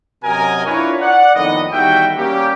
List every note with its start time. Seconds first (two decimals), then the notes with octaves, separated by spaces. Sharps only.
0.24 F#2 C3 F#3 A#4 D#5 G#5
0.66 D4 E4 F4 A#4 B4 C#5
1.00 D5 F#5
1.35 F2 A2 D#3 B3 D#5
1.72 E2 D#3 G3 F#4 E5 G5
2.16 G3 A#3 C#4 G4